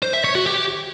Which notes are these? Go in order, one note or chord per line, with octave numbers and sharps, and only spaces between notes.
C5
E5
C#5
F#4
G4